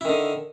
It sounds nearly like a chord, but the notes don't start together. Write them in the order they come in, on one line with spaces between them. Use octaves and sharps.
E4 D#3 D3